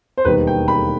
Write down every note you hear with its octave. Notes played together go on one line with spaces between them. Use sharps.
C5
E1 D#2 D#3 G3 B4
G5
B5